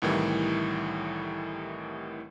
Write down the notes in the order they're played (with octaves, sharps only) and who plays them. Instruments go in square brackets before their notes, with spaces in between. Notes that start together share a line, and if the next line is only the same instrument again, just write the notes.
[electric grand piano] C2 A2 D#3 E3 G3